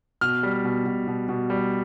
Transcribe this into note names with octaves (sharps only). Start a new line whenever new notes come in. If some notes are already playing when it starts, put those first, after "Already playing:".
B2 F6
G3
B2
B2
B2
B2
G3